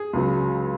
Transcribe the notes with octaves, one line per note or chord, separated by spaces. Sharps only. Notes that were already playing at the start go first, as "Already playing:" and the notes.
Already playing: G#4
C#2 C#3 F#3